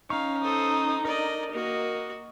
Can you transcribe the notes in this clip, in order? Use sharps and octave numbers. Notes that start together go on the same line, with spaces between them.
C#4 D#4 F5 C#6
A4 C5 D#6
D4 A#4 D5 D#5 A#5
A#3 F#4 D#5